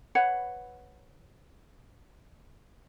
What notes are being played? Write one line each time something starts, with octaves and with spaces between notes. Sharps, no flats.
B4 C#5 F#5